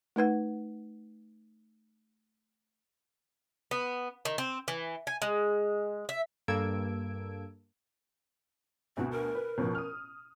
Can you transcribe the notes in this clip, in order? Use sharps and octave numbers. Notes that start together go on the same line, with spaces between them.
A3 D#4 B4 F#5
B3
D#3
C4
E3
G#5
G#3
E5
G2 A#3 A4 E6 G#6 D7
D2 B2 C4 F#4
A#4
B4
A1 B2 F3
D#6 F6